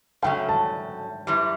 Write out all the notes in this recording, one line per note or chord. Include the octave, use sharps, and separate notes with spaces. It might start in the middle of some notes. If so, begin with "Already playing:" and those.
C#3 F#3 A3 C#4 G5
A5
F#2 E3 G3